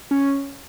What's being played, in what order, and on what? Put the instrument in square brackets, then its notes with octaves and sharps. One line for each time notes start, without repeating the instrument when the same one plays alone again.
[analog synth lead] C#4